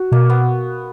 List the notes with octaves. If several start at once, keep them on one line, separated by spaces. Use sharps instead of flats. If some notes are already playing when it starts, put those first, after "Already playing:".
Already playing: F#4
B2 A#3
B3